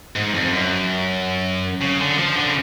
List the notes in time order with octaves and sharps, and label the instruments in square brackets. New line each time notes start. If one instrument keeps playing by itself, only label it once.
[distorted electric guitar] G#2
F2
F#2
C#3
D3
F3
D3
C#3